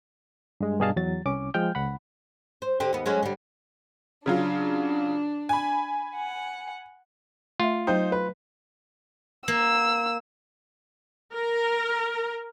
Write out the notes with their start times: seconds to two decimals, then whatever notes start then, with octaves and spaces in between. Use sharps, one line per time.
0.61 G2 G#3
0.80 G2 B2 G#4 D#5 F5 A5
0.96 E2 F#3 A6
1.25 C2 C#4 D6
1.54 F3 G#3 G5 F6 G6
1.75 C#2 F#5 B5
2.62 C5
2.80 D3 C4 G4
2.93 D#2 B3
3.06 F#3 G#3 C#4
3.23 D3 G3
4.26 C#3 F#3 D4 F4
5.49 G#5 B5
6.16 F#5
7.60 A3 F4 E5
7.87 F#3 D#4 C5 F5 G5
8.12 B4
9.48 A#3 E6
11.33 A#4